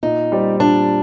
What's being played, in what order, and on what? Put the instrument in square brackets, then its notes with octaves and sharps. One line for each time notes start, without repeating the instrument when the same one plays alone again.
[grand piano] A#2 [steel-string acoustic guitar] D#4
[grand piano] G3 C4 G4 D5
[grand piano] A#2 [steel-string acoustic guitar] D4